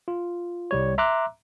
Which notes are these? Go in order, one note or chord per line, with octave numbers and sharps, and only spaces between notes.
F4
C2 G3 C#5
E5 A#5 C6 D6 E6 F#6